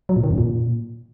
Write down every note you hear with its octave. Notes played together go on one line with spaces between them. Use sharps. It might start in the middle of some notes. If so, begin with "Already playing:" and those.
F#3
A#2
D#3
F#2
A#2